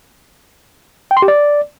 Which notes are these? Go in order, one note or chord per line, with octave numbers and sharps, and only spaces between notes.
G5
C6
G4
D5